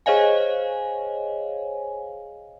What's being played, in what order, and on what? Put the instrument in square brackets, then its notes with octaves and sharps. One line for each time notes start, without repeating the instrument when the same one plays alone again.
[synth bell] G#4 C5 C#5 D#5 F5 G#5